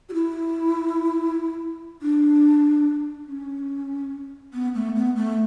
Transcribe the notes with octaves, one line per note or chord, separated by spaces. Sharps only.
F#4
E4
D4
C#4
B3
A3
B3
A3